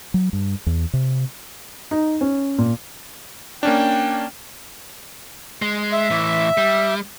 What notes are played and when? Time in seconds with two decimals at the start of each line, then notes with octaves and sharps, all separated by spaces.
0.14 F#3
0.33 G2
0.66 E2
0.93 C3
1.91 D#4
2.21 C#4
2.58 A#2
3.63 A#3 C#4 D4 G5
5.62 G#3
5.93 E5
6.10 A2 E3
6.57 G3